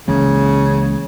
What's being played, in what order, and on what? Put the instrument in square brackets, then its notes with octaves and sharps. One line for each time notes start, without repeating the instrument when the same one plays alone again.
[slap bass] C#2 E3 A#3 [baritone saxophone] C#3